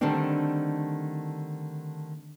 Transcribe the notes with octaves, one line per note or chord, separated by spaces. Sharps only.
D3 D#3 G3 A3 C4 D4